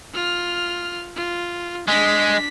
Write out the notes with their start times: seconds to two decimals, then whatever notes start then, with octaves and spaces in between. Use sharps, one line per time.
0.14 F4 F6
1.16 F4
1.88 G#3 D4 B6